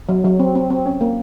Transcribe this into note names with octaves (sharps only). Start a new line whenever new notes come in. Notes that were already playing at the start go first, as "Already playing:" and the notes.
F#3
F#3
C4
C4
C4
C#4
A#3